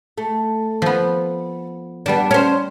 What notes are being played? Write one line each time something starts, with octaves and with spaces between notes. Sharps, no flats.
A3
F3 B3
G3 B3 D4 A5
C#4 C5